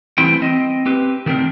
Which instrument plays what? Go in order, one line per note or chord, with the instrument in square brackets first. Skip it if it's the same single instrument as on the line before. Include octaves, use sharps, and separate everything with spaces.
[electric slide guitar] E3 G3 A3 C4 E4 G5
C4 D#5
C4 G4 B4
D#3 A3 C4 D4 A#4